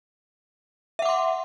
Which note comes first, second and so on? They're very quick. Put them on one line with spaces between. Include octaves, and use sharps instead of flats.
E5 F#5 D6 C6